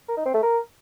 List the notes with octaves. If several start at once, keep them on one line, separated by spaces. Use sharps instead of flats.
A#4
D#4
C4
A3
A#4